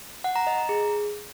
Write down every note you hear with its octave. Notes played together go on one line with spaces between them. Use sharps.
F#5
A#5
D#5
A#5
G#4